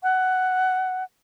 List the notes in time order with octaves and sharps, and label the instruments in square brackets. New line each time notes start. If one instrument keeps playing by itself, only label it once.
[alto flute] F#5